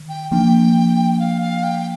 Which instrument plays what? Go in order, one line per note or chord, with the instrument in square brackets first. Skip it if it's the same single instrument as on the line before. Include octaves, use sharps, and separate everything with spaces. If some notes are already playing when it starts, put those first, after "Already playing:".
Already playing: [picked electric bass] D#3
[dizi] G5
[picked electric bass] F3 A#3 D4 [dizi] G5
[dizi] G5
F5
F5
G5